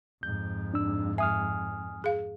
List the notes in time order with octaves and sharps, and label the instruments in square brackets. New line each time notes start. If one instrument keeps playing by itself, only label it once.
[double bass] F2 G#2 [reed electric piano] G6
[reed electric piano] D4 E6
[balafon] E5 [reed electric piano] G#5 D#6 F6
[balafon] G#4 F5